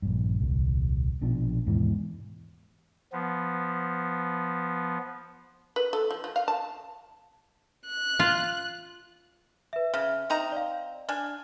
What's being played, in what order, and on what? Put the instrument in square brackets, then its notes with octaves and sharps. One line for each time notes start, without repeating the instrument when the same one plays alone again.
[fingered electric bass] A#1 G2
D#1 C2
A#1 B2 F3 D4
D#2 G#2 B2 E3
[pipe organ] F3 B3
[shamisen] B4
A4
F3
F3
F5
A5
[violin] F#6
[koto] F4
[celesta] B4 E5
[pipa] C#3 [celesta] E5 F6
[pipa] C4 D#4 A#5
[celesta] D5 F5
[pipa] D4 G#5 [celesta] F6